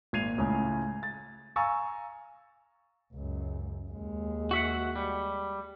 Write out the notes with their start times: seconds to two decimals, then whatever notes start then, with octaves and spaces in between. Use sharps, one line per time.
0.13 G#1 A#2 G#6 C7 D#7 F7
0.38 C#2 A2 C#3
1.03 A6
1.56 F5 G#5 A#5 C#6 E6 A6
3.13 C#2 F#2
3.91 D#2 G#3
4.51 F#4 E5 F#5
4.96 G3